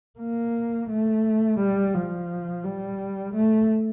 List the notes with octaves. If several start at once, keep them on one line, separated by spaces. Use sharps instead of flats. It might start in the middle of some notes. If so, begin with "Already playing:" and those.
A#3
A3
G3
F3
G3
A3